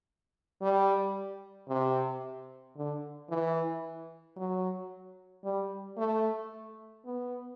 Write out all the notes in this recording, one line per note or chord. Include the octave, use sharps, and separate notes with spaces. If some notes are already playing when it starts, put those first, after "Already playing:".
G3
C3
D3
E3
F#3
G3
A3
B3